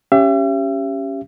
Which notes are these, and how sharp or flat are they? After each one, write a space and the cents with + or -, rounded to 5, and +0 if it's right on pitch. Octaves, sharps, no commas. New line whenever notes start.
C#4 +0 G4 +0 E5 +40